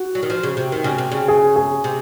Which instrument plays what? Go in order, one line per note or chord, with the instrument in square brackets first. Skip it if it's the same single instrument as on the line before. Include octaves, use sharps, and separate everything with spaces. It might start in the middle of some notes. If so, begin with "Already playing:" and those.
Already playing: [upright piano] F#4
[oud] F#3
D#3
F3
C#3
C3
D#3
C#3
C3
C#3
[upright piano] G#4
G#4
[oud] C3